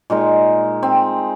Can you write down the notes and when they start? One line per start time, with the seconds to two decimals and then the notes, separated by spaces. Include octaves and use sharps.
0.10 A#2 G#3 D#4
0.83 C4